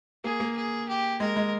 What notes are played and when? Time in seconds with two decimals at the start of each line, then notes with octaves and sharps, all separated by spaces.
0.24 A#3 G#4
0.40 A#3
0.56 G#4
0.88 G4
1.20 G#3 A#4
1.36 G#3